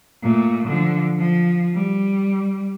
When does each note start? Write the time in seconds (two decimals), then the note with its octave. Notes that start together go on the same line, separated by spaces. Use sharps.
0.23 A#2 A3
0.68 D3 F3
1.19 F3
1.74 G3